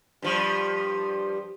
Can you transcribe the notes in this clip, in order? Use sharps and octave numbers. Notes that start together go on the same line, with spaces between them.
G2 F3 G3